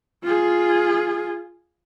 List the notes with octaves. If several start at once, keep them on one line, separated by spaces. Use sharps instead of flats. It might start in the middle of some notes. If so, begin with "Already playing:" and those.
F4 G#4